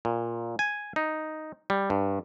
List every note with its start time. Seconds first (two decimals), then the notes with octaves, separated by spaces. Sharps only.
0.05 A#2
0.59 G#5
0.96 D#4
1.70 G3
1.90 G2